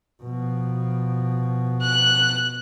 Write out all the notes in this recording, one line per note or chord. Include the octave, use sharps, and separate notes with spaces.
B2 F3
F#6